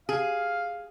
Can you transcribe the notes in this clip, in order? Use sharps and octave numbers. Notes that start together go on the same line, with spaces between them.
G#4 F5